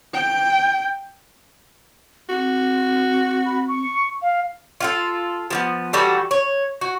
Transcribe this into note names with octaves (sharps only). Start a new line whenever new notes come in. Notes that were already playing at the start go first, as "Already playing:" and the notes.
G5
C4 F#4
B5
C#6
F5
F4 F#4 A4
F3 A#3 B3
E3 G3 F#4 A4
C#5
F#4